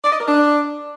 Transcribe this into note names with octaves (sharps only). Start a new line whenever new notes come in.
D5
D#5
A#4
D4